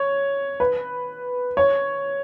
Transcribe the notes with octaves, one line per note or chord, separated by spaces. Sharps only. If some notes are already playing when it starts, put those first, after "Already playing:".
Already playing: C#5
B4
C#5